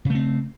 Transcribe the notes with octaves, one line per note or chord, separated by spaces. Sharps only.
C#3 A3 C4